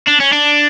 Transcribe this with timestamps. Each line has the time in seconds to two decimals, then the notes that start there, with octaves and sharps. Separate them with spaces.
0.07 D4
0.20 C#4
0.32 D4